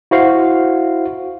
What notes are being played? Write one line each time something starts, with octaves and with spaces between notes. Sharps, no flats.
E4 F#4 C5 F5